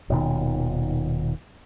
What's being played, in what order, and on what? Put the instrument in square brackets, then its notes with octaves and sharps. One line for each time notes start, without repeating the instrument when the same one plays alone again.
[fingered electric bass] D#1 B2 D#3